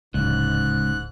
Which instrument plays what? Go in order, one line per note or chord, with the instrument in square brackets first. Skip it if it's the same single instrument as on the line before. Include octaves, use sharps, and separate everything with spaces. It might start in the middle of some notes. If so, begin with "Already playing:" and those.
[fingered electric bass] D1 [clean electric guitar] C#2 [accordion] G#2 F#6